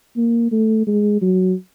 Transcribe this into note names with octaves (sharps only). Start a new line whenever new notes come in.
A#3
A3
G#3
F#3